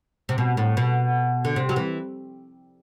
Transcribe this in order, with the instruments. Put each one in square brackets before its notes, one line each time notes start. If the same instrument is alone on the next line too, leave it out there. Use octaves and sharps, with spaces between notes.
[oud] C3
B2
A2
B2
D3
C3
F#3
E3